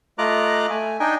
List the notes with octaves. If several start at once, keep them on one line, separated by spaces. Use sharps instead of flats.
A3 F4 D#5 A#5 D6 F#6
A3 G#5
D4 D#4 D#5 G5 G#5